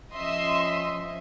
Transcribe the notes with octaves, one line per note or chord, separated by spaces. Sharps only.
F3 C#4 D#5 E5 C6